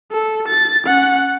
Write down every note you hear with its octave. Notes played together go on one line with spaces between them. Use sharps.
A4
A6
C#4 F#5